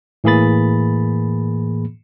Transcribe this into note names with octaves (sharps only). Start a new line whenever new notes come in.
A2 E3 A#3 G#4 B5 A6